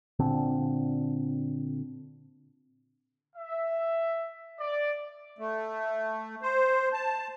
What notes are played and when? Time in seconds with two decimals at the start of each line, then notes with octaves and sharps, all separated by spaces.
0.19 A#2 D3 C4 D4
3.35 E5
4.59 D5
5.38 A3
6.42 C5
6.93 A5